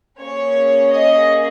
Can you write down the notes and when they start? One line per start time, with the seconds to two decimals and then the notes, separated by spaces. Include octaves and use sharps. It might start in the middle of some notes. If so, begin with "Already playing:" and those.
0.20 A#3 C#4 G#4 C#5
0.90 D#5